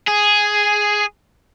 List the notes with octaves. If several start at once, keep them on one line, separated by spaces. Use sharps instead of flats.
G#4